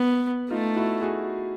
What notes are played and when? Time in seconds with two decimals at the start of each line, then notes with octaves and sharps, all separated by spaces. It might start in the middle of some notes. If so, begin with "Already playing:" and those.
Already playing: B3
0.50 A3 D#4 F4
0.76 E4 F#4
1.01 F#4 G#4